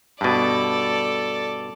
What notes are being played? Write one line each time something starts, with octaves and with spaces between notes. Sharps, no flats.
G2 B2 A4 D5